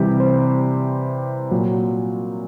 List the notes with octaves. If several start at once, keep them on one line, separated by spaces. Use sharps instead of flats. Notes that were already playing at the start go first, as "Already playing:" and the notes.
Already playing: C3 E3 G3 G4
C5
A#2 F#3